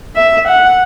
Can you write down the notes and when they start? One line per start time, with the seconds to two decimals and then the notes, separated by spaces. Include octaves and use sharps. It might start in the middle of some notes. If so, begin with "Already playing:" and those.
0.16 E5
0.47 F#5